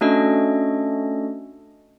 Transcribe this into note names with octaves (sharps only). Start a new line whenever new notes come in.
A3 C#4 D4 F#4 A4 D#5